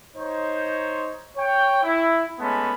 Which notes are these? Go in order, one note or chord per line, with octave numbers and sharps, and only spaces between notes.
D#4 C5 C#5
C#5 G5
E4
G#3 A3 B3 C#4 A5 B5